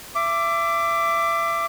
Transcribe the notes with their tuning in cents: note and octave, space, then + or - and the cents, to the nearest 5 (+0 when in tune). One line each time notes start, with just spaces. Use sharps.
E5 +25 D6 +0